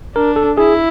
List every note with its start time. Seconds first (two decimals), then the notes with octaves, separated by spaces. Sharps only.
0.15 D4 A#4
0.36 A4
0.58 E4 G#4